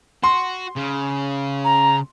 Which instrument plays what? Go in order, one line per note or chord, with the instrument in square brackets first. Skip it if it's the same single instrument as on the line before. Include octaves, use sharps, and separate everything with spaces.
[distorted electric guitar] F#4 [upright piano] C6
[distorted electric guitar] C#3
[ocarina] A#5